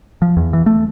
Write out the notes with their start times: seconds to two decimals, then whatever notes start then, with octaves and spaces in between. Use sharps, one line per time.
0.22 F3
0.37 E2
0.53 E3
0.66 A3